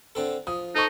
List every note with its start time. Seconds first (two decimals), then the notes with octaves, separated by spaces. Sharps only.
0.15 D3 C4 A4
0.47 F3 D#6
0.75 D#4 A4 C5 C#6